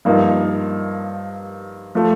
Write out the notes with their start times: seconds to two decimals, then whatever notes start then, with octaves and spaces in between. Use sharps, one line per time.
0.05 G2 F3 A#3 D#4
1.95 F3 A3